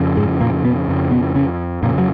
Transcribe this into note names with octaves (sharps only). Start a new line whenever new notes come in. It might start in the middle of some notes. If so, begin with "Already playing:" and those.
Already playing: F2 C#3
G#2 G#3
A#2 A#3
B2 B3
F2 C#3
B2 B3
C#3 C#4
F2 A#2 C#3 A#3
F#3